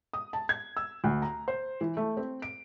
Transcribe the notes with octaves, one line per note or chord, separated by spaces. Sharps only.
D#6
A5
G#6
E6
D2
A#5
C5
E3
A3
C4
D7